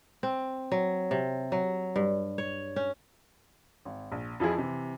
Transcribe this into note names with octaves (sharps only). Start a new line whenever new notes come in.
C4
F#3
C3
F#3
G2
C#5
C#4
G#1
A#1
F2 F3 E4 G#4
C3 E3